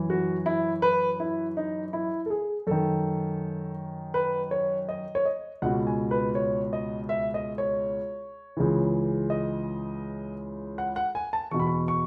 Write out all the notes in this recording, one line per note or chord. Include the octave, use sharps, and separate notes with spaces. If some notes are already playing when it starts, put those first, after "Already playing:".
Already playing: F#2 E3
F#4
E4
B4
E4
D#4
E4
A4
G#4
F#2 D#3 A4
B4
C#5
D#5
C#5
D#5
C#2 B2 F#5
G#5
B4
C#5
D#5
E5
D#5
C#5
C#2 C#3 E3
D#5
F#5
F#5
G#5
A5
E2 B2 C#6
B5
C#6
C#6